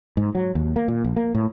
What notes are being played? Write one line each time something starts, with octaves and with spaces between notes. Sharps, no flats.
G#2
F#3
D#2
A#3
A#2
A#1
A#3
A2